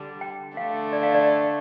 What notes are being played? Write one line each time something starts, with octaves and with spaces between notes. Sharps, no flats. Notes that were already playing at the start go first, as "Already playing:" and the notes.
Already playing: D3 G3 D4
G5
D3 A3 D4 F5
D5
F5
D5